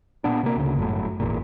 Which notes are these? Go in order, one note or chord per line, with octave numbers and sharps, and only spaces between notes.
A#2 B3 D4
C3 A#3
D2 C#3
G1 F#2 A2
G#1 E2 A#2